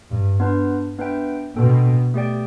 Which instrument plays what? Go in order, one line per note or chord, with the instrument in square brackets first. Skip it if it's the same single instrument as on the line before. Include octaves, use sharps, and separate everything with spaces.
[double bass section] G2
[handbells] B3 D4 B4
B3 D4 B4 E5 G5
[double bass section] B2 [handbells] B3 D4 A4 G5
[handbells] A3 G4 D5 G5